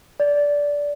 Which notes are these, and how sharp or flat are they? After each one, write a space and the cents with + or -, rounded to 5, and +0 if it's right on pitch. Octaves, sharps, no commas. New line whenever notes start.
D5 -15